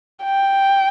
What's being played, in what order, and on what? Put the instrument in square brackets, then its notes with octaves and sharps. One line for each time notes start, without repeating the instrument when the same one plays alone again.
[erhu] G5